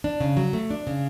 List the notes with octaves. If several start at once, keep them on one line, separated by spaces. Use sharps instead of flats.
D4
C#3
F#3
A3
D4
C#3